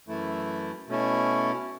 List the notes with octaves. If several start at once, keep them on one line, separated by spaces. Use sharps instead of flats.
F#2 E3 A3 E4
B2 A3 C#4 E4